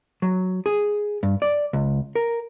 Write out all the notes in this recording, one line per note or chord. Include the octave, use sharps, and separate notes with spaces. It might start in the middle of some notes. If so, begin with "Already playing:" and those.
F#3
G#4
G2
D5
C#2
A#4